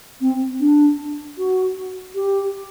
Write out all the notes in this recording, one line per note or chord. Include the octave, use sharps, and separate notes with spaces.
C4
D4
F#4
G4